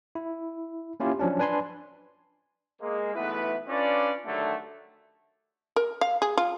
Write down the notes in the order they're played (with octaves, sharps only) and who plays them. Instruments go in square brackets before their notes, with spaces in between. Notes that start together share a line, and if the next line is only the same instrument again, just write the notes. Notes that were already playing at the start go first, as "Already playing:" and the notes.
[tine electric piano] E4
A#3 C#4 E4 F4 G4
F3 F#3 C#4 D4
D4 B4 G#5 B5 C6
[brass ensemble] G#3 A#3
B1 E3 A3 B3 E4 B4
C#4 D4 F4 B4 D5
G2 D3 D#3 F#3 A3
[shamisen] A#4
F5
G#4
F4